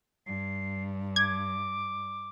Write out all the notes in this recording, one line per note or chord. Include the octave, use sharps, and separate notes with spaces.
G2 C7
D6 G#6